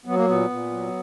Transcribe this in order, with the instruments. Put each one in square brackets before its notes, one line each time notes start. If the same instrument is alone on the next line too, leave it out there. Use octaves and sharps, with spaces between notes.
[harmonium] F#3 B3
A#3
A#2 B3
A#2
F#3